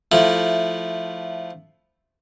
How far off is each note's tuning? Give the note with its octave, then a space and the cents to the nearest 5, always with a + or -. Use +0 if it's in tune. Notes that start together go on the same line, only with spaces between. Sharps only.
F3 +0 A3 +0 E4 -5